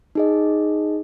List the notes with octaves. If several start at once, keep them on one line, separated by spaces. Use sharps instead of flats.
D#4 G#4 D#5